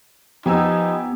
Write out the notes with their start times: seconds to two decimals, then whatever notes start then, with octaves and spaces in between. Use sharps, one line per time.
0.46 F3 B3 D#4 G4 G#5 E6